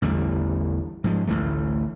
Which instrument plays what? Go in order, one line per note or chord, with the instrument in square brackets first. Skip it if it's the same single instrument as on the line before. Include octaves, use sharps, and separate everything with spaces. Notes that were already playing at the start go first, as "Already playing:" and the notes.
[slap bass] A1 E2 D3 G3
G#2 F3 G#3
A1 D2 E3 A3